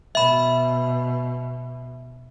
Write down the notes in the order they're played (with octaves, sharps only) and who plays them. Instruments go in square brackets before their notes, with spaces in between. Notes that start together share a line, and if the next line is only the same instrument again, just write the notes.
[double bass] B2 [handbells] E5 B5